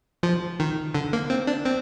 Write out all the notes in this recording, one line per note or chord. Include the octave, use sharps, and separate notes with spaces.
F3
D#3
D3
A#3
C4
D4
C4